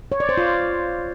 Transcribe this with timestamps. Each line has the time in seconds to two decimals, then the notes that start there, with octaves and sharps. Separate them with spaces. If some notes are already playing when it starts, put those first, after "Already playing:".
0.12 C#5
0.20 D5
0.29 C5
0.37 F4